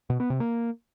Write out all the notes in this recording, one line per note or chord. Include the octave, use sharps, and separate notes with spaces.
B2
B3
C3
A#3